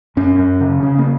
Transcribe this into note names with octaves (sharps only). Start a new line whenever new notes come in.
F#2 C#4
F#2
C#3
C#3
A#3